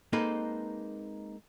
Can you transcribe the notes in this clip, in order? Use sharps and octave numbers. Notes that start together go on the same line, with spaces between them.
G#3 A#3 C4 D#4 A4 B4